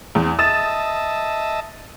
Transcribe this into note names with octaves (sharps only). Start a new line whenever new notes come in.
E2 C4
D#5 E5 A5 D#6 A6 E7